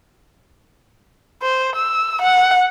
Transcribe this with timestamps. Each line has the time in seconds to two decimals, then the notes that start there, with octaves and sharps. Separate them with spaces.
1.42 C5
1.76 E6
2.22 F#5